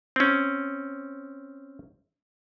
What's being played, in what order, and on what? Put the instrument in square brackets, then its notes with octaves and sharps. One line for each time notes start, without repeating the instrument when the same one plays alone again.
[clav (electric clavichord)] C4 C#4